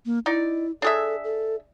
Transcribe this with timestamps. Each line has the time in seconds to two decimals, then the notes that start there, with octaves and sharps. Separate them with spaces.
0.06 A#3
0.26 D#4 E4 D5
0.82 D4 G#4 A4 E5
1.24 A4